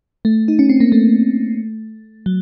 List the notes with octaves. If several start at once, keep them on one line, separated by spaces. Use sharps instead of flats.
A3
D#4
C#4
C4
A#3
A3
F#3